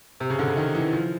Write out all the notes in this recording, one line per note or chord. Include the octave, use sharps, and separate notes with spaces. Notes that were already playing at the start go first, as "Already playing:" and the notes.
C3
C#3
D3
C#3
D#3
E3
F3